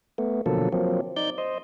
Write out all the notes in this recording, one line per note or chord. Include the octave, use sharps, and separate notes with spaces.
A3 B3
B2 D3 F3 F#3 A#3 A4
F3 F#3 A#3 C4
D#4 D5 G6
C5 D#5